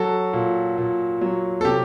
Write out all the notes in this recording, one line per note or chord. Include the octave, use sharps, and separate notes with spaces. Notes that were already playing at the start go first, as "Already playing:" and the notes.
Already playing: F#3 F#4 A4
A#2
A#2
F#3
A4
C3 G4